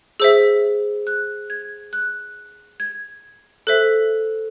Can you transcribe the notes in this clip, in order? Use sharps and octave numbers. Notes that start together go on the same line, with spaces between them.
G#4 C5 E5 E6
F#6
G#6
F#6
G#6
A4 C5 E5 F#6